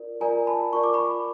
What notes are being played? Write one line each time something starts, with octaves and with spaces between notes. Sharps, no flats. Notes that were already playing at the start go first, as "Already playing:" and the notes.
Already playing: F4 A#4 D5
F4 A#4 D5 G#5 A#5
A5 B5
F4 A#4 D5 C#6
D6
B5 C#6